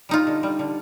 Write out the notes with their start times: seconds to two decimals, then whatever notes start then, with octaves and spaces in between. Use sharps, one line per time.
0.09 G3 D#4 F4
0.27 D3
0.43 G3
0.59 D3